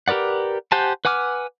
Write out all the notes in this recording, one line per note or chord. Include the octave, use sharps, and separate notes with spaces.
G4 A#4 B4 D5 F#5
G4 C5 F#5 G#5 A5
B4 F#5 G#5 D6 F6